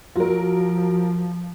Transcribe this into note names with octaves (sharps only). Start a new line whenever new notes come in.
F3 F#3 F4 A#4